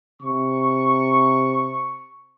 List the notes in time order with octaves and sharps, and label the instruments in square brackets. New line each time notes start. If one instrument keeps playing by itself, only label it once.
[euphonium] C3 [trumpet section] C#6